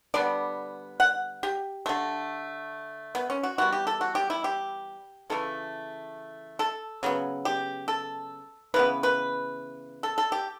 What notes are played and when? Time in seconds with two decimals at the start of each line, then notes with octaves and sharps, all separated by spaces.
0.14 D3 G3 B3 D5
1.00 F#5
1.43 G4
1.86 D3 A3
3.15 B3
3.30 C#4
3.43 F#4
3.58 E3 G3 B3 F#4
3.72 G4
3.87 A4
4.01 F#4
4.15 G4
4.30 E4
4.44 G4
5.30 C#3 E3 A3 A4
6.59 A4
7.03 C#3 F#3 B3
7.45 G4
7.88 A4
8.74 C#3 E3 B3 B4
9.03 B4
10.03 A4
10.18 A4
10.32 G4